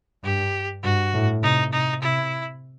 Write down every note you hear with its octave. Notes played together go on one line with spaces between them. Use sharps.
G2 G4
G2 F#4
A2
C3 D#4
C3 D#4
C3 E4